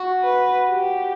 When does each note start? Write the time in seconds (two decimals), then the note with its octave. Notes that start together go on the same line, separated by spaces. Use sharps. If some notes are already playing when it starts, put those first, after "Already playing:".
Already playing: F#4
0.23 B4
0.70 G4